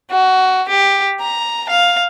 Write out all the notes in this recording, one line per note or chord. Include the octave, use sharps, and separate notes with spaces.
F#4
G4
A#5
F5